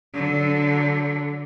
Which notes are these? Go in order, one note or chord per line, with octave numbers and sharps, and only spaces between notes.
D3 F#3